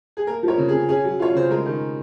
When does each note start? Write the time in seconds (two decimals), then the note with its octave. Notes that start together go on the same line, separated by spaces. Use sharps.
0.17 G#4
0.27 A#3 A#4
0.43 F3
0.48 A#4 C#5
0.58 C#3
0.69 G#4
0.73 C#3
0.89 C#4 G#4
1.04 F#3
1.19 F4 C#5
1.35 C#3 C5
1.50 G#3 A#4
1.66 D#3